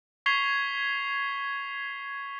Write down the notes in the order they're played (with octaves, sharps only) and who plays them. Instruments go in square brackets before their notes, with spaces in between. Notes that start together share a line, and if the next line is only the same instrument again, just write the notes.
[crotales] C#6 G#6 B6 C7 F7 G7